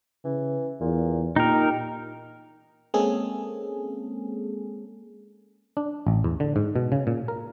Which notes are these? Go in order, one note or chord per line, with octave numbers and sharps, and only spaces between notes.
C#3 E3
E2 A#2
A#2 D#4 G4 A#4
G#3 A#3 C4 C#4 G#4 A4
D4
A1
E2
D3
G#2
B2
C#3
A#2
A#4